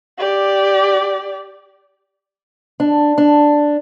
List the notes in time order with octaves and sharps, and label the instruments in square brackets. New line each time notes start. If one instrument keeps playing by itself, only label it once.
[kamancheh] G4 D5
[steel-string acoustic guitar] D4
D4